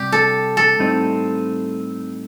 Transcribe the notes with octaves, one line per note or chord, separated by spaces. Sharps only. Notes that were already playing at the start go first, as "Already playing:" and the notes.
Already playing: C3 G3 G4
A4
A4
A2 G3 C4 D#4